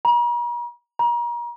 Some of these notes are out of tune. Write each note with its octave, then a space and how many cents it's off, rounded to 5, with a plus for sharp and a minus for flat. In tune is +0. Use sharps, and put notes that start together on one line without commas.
A#5 +45
A#5 +35